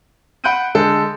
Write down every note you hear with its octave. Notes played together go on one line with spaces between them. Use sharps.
F#5 B5 F#6 G6 D7 D#7
D3 G#3 A4